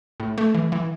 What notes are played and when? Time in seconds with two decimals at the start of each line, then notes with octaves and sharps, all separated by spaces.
0.20 A2
0.38 A3
0.55 E3
0.72 E3